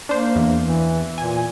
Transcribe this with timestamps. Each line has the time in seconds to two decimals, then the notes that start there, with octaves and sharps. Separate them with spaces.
0.09 A#3 D4 C5
0.36 E2
0.60 E3
1.18 A#2 G#5